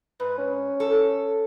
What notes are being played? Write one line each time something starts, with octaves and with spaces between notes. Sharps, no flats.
G#2 B4
C#4
A4